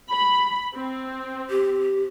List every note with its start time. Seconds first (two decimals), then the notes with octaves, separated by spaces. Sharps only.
0.11 B5
0.74 C4
1.50 G4